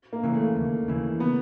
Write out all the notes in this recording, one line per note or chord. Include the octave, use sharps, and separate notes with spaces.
A#3
C#3 E3
A3
D#2
C#3 E3
B3